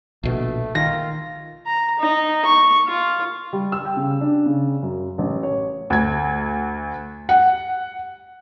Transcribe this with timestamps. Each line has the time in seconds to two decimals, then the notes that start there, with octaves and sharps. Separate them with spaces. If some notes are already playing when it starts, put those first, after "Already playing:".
0.23 A#1 B2 A3
0.75 D#3 F4 A#6
1.66 A#5
1.99 D#4
2.45 C#6
2.87 F4
3.53 G3
3.72 E6
3.85 G5
3.97 C#3
4.21 D4
4.46 C#3
4.83 F#2
5.18 A1
5.43 C#5
5.90 D2 G#6
7.29 F#5